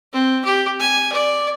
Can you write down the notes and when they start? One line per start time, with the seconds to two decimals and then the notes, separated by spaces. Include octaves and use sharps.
0.13 C4
0.45 G4
0.80 G#5
1.12 D5